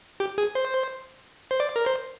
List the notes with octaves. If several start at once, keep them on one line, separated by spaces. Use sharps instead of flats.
G4
G#4
C5
C5
D5
A#4
C5